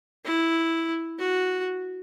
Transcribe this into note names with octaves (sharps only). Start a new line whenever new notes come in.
E4
F#4